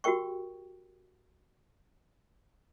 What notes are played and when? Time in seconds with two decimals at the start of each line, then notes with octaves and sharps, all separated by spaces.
0.04 F#4 G4 A#4 G5 C#6